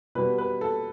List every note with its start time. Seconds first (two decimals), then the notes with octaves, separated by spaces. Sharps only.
0.15 B2 G3 B4
0.38 B4
0.61 A4